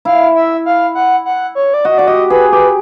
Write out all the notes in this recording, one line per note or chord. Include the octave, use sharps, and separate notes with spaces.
E4 F5
E5
F5
F#5
F#5
C#5
D5
F#4 D#5
F#4 D5
G4 D#5
G#4 B4
G4 B4